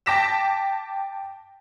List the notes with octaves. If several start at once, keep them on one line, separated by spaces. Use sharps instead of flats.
G5 A5 D6 A#6 B6 E7